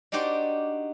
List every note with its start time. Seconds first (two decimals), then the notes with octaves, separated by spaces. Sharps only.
0.12 D4 D#4 F#4 G4 C5 D5